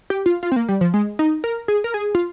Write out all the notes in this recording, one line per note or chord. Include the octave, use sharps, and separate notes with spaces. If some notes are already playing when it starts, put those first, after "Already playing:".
G4
F4
F4
C4
A#3
G3
F3
G#3
D#4
A#4
G#4
A#4
G#4
F4